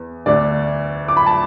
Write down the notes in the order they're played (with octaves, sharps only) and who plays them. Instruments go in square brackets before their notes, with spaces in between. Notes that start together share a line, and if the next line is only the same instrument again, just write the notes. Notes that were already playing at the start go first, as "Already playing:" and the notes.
Already playing: [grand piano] E2
D2 D3 D5
D6
B5
A5